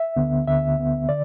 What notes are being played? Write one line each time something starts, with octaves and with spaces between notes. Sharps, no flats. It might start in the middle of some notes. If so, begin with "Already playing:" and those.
Already playing: E5
D2 D3 B3
D2 D3 B3 E5
D2 D3 B3
D3 D5